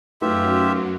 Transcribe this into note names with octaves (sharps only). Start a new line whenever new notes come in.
F#2 F#3 A3 D#4 F4 G4 B4 E5